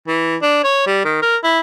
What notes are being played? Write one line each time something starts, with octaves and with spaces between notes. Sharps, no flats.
E3
D4
C#5
G3
D#3
A#4
E4